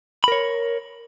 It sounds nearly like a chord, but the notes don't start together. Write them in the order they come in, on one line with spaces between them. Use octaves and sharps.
B5 A#4 C#5